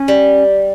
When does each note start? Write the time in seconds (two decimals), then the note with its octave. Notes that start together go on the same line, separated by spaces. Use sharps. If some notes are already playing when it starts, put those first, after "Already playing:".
Already playing: C#4
0.08 G3